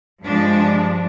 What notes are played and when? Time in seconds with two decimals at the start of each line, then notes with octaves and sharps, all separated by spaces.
0.23 G2 F3 G#3 D4